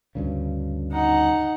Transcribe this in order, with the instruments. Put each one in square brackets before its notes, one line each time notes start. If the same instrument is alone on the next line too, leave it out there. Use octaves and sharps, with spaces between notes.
[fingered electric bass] D2 G2 C#3
[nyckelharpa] D#4 F#5